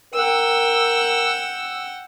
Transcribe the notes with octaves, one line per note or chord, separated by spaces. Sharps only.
A#4 F#5 G5 E6